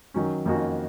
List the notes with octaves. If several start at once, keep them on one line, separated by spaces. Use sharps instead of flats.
D#3 F#3 C#4
F2 D#3 A#3 C#4 F#4